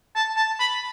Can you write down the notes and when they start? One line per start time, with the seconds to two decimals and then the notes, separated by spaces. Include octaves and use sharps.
0.16 A5
0.37 A5
0.60 B5